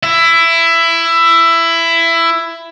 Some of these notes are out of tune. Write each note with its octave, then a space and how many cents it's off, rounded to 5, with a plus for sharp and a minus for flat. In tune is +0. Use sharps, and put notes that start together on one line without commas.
E4 +15